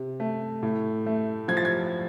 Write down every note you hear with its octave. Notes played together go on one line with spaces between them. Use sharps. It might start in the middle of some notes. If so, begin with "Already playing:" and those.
Already playing: C3
A3
A2
A3
F3 G#6
A6
G#6